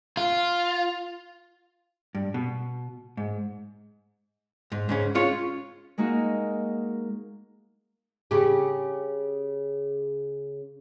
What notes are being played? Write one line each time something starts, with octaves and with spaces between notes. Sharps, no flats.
F4
G2
B2
G#2
G#2
G#2 C#3 C#4
G#3 C#4 F4 C#5
G#3 A#3 D#4 F#4
C#3 G4